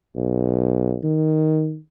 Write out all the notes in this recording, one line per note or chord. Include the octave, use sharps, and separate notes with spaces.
B1
D#3